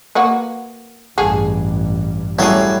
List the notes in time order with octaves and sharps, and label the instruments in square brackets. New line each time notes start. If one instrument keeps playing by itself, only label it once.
[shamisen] A#3 F#4 B4
[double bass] A1 G2 [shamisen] G#4 A4
[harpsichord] A2 F#3 A4 [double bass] G3 [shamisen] C#4 G#4